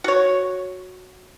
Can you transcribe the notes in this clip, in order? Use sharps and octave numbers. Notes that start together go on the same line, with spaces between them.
F#4 C#5